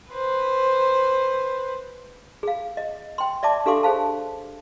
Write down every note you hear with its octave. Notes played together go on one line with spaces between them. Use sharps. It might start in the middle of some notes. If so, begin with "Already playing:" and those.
B4 C5
G#4 F5
D#5
G5 C6
D5 E5 A5 D6
D4 G4 A4 F5 C6 D6
G#4 C5 F5 A5